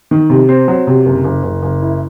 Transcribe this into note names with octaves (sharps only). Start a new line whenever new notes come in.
D#3
C3
C4
F#3
C3
F#1
F#1
F#1
F#1
E4